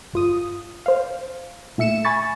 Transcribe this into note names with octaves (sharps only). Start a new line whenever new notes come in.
G1 F4 D#6
C5 F5
A#2 A3 E5 C#7 E7
G#5 B5 C#6 A6